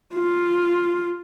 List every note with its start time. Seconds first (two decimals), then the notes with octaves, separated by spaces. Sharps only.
0.14 F4